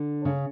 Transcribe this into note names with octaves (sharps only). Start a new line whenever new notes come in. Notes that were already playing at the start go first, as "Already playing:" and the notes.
Already playing: D3
C#3